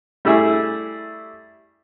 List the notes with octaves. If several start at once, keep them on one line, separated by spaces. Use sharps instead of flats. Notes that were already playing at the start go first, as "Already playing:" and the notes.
G3 A3 E4 G#4